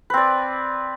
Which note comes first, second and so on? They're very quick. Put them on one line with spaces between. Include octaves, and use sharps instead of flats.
B4 C4 D5